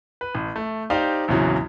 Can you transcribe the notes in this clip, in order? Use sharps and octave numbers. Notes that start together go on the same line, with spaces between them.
B4
A1
A3
D#4 G4 C5 D5 F5
A#1 E2 C#3 E3 F#3